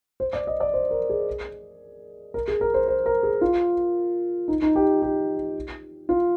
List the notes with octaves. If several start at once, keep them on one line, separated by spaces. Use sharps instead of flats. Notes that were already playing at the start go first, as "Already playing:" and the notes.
C5
D5
D#5
D5
C5
A#4
G#4
A#4
G#4
A#4
C5
C5
A#4
G#4
F4
D#4
D#4
G4
G4
F4